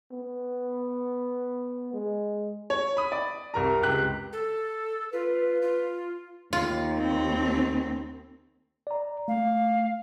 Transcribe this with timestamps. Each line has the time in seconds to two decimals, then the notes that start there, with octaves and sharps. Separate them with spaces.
0.12 B3
1.94 G#3
2.70 C#5
2.97 B5 D#6
3.12 D5
3.54 C2 A#4 A#5
3.82 C#2 G4 F#6
4.33 A4
5.13 F4 B4
5.29 B4
5.62 F4
6.53 D#2 F4
6.98 C4
8.87 D5 A#5
9.28 A3 F5